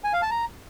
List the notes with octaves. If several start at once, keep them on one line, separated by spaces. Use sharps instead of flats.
G#5
F5
A5
A#5